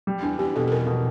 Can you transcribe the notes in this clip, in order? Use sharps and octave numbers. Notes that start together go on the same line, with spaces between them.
G3
E2 D4
E2 G4
B2 A4
A4
E2 A#4
B2